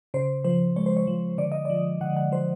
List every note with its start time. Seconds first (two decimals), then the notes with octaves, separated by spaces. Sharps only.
0.14 C#3 C5
0.44 F3 C5
0.76 G#3 C#5
0.86 C5
0.97 C#5
1.07 F3
1.38 D3 D5
1.52 D#5
1.65 F3 D5
2.01 D3 F#5
2.17 F#5
2.32 F3 C5